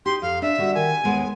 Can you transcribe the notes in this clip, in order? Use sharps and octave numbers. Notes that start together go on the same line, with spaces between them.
D#4 G4 C6
F2 F5
D4 E5
D3 G3 F#4
D#3 G#5
D#2 G#3 B3